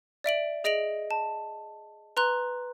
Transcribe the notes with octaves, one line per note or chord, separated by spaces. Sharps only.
D5 E5 D7 F#7
G#4 D#5 A#6 D7 F7 F#7
A5
B4 A#5 C6 F#6